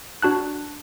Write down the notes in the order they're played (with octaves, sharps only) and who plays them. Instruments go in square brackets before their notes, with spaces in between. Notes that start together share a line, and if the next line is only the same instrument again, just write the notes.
[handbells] D4 F#4 A5 F#6